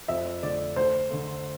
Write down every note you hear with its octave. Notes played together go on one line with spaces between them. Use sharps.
F2 E5
D3 A3 D5
D2 C5
D3 A3